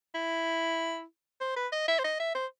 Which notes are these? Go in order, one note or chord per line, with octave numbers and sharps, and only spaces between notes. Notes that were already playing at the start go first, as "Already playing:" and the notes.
E4
C5
B4
D#5
E5
C5
D#5
E5
C5